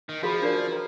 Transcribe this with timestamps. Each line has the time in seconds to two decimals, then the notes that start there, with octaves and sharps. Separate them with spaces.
0.09 D#3
0.23 F3 F#4 G#4 B5
0.42 D4 A#4 D5
0.72 B4 A#5 C6